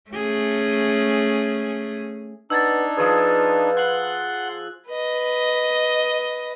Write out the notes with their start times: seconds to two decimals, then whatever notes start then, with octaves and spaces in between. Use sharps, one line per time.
0.11 A3 C#4 G#4
2.50 B3 D4 D#4 E6 G#6 A6
2.97 F3 G#4 B4
3.77 F#5 C6 F#6 F#7
4.90 B4 D#5